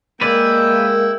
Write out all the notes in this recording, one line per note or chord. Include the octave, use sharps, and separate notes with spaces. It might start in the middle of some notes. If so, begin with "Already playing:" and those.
G#3 A#3 E4 A#4 B4 D5 G5